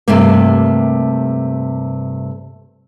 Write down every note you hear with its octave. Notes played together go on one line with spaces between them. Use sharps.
G2 C3 A3 A#3